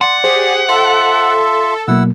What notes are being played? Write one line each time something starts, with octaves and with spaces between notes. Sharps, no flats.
D5 F#5 C6
G4 G#4 C5
F4 A4 E5
B2 F#3 A#3 E4 F#5 E6